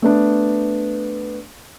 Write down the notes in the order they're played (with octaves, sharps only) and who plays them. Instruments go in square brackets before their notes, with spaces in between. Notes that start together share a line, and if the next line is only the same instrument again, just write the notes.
[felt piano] A3 B3 D4